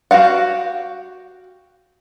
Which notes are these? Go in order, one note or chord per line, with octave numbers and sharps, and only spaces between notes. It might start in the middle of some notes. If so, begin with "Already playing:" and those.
F#4 G4 F5 F#5